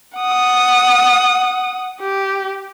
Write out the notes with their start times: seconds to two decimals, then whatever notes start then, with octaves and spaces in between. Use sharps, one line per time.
0.17 F#5 D#6
2.01 G4